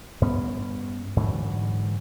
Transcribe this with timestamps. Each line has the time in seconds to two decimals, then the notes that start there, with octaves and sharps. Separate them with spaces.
0.22 G2 B3 C#4
1.16 G#2 D3 E3 F#3